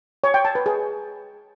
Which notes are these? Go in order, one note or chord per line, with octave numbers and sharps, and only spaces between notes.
C#5
G5
A5
B4
G#4